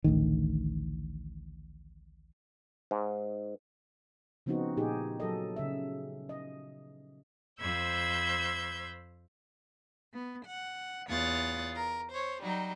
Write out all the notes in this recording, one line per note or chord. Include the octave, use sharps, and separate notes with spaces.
A1 D2 D#3
G#2
C#3 F3 B3 C4 D#4 F#4
A#2 D#4 G4 G#4
F#3 A4 D#5
C#3 E5
D#5
F2 C5 B5 E6 G6 G#6
B3
F#5
E2 F4 C#5 D#6 F#6 A6
A#4
C5 C#5
F#3 G3 D#4